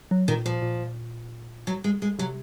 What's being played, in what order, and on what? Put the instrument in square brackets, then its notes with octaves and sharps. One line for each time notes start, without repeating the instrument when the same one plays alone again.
[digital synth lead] F#3
[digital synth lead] A#2 [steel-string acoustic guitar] D#3
[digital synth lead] A#2 [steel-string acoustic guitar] F3
[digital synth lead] A#2
[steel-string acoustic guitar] F#3
G#3
G#3
[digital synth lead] C3 [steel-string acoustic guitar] F#3